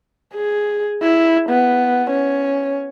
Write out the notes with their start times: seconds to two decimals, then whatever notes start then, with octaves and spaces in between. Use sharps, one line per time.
0.34 G#4
1.02 E4
1.50 B3
2.10 C#4